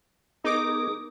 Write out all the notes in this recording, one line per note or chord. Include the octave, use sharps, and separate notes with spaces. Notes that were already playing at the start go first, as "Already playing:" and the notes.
B3 D#4 G#4 A#4 D6 D#6